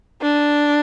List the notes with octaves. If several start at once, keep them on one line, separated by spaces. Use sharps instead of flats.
D4